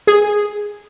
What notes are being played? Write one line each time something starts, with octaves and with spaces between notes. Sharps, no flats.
G#4